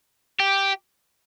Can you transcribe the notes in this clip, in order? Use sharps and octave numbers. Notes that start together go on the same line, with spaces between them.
G4